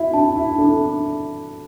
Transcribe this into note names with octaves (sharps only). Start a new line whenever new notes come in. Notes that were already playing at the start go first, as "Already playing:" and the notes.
Already playing: E4 F#4 E5
D4 A5
E4
D4 A4